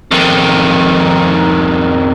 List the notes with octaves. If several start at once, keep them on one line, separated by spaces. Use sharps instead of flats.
F2 D#3